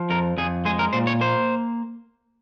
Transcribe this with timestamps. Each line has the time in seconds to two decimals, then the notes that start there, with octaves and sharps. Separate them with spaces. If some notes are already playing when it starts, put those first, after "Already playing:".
Already playing: F3
0.10 F2 A#4
0.38 F2 G#4
0.65 G#3 G#4
0.79 A#4
0.93 A#2 C5
1.07 C#5
1.21 A#3 C5